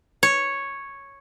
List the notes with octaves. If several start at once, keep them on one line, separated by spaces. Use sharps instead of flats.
C#5